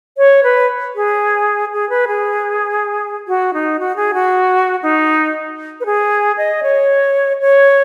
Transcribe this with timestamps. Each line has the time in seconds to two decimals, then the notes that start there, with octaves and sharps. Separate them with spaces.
0.18 C#5
0.43 B4
0.95 G#4
1.73 G#4
1.90 B4
2.08 G#4
3.28 F#4
3.54 D#4
3.80 F#4
3.96 G#4
4.14 F#4
4.83 D#4
5.80 B4
5.86 G#4
6.37 D#5
6.63 C#5
7.41 C#5